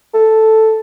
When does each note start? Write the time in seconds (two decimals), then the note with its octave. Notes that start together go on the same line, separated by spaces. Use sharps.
0.14 A4